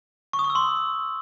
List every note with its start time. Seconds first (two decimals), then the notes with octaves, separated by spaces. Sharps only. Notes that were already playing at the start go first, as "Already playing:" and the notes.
0.33 C#6
0.39 D#6
0.44 C#6
0.50 E6
0.55 C6